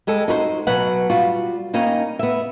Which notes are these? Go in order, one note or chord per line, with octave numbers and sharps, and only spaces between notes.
G3 G#3 A4
D#4 F#4 B4 C5
B2 F#3 B4 F#5
G3 F4 F#4
G3 A#3 C#4 D#4
B3 E5